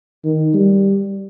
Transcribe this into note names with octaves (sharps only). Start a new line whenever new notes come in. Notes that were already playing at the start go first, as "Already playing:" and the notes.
D#3
G3